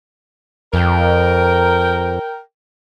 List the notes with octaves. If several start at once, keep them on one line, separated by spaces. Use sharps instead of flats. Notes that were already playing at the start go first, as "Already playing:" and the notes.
F2 A#4 G5